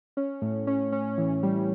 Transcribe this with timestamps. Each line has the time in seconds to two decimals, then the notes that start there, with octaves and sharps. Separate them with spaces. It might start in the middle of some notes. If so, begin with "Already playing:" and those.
0.17 C#4
0.42 A2
0.67 C#4
0.92 C#4
1.18 E3
1.43 G3